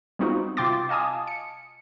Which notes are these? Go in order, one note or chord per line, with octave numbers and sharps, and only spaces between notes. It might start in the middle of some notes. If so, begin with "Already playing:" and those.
G3 B3 C4 D#4 F4 F#4
C3 F4 G5 C6 D6 A6
D#5 F5 G#5 A5 D#6
C#7